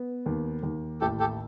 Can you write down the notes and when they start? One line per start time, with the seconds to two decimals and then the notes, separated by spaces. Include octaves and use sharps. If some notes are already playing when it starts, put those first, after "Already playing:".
Already playing: B3
0.26 D#2
0.63 D#2
1.01 A1 G4 A4
1.20 G4 A4